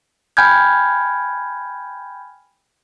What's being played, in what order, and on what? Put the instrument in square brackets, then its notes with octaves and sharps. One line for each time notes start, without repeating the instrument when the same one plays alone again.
[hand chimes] G5 G#5 B5 F6 G6 G#6